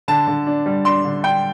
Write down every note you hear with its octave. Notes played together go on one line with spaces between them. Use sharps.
D3 A5
D3
D4
G3
D4 C6
D3
D4 G5